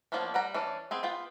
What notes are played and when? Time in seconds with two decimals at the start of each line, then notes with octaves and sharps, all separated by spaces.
0.12 F3 A#3 B3 C#4 D4
0.34 G3 F#5 A#5
0.54 E3 C#4 D4
0.91 B3 C4 G#4
1.03 B3 F4 G5